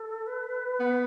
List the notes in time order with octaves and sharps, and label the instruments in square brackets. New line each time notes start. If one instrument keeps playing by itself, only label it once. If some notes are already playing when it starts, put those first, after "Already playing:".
Already playing: [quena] A4
B4
[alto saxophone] B3